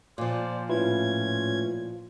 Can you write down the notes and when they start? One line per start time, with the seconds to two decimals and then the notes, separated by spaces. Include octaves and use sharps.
0.18 A#2 F3 C5 D5
0.69 A2 C#4 E4 F4 B4 G#6